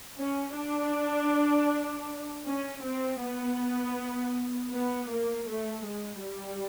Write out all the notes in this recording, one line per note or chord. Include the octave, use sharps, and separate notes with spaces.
C#4
D4
C#4
C4
B3
B3
A#3
A3
G#3
G3